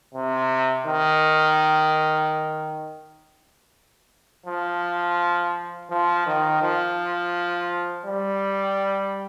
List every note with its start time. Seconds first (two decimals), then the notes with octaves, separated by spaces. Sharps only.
0.14 C3
0.86 D#3
4.46 F3
5.90 F3
6.26 D#3
6.62 F3
8.06 G3